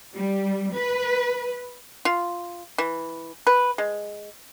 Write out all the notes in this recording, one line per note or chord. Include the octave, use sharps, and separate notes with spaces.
G3
B4
F4
E3
B4
G#3